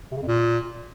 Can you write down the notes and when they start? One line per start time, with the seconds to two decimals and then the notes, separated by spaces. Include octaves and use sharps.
0.12 C3
0.17 C#3
0.22 F2
0.28 A#2